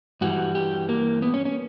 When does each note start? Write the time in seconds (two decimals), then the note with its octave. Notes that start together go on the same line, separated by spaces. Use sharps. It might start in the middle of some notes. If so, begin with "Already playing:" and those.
0.21 G2 E3 G3 F#4
0.55 G4
0.89 A#3
1.22 B3
1.34 C#4
1.45 C#4